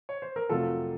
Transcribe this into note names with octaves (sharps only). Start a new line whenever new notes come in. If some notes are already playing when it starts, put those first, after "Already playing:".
C#5
C5
A#4
F2 C3 F#3 A3 F4 A4